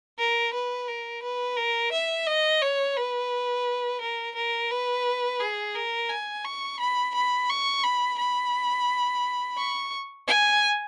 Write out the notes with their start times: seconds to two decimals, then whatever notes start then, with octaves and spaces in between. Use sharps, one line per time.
0.19 A#4
0.54 B4
0.88 A#4
1.23 B4
1.57 A#4
1.93 E5
2.27 D#5
2.62 C#5
2.97 B4
4.01 A#4
4.35 A#4
4.71 B4
5.40 G#4
5.75 A#4
6.09 G#5
6.45 C#6
6.80 B5
7.15 B5
7.50 C#6
7.84 B5
8.18 B5
9.58 C#6
10.27 G#5